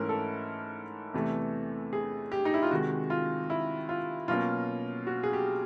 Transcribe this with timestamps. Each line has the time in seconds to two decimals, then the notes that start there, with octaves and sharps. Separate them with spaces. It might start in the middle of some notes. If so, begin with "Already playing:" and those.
Already playing: G#2 E3 A3 C#4 E4 A#4
0.09 A4
1.14 E2 C3 E3 A3
1.93 G#4
2.32 G4
2.45 D#4
2.54 E4
2.63 F4
2.71 C3 D#3 G#3 F#4
3.10 F4
3.50 E4
3.89 F4
4.28 B2 F#3 A#3 C#4 F4
5.07 F#4
5.23 G#4
5.33 G4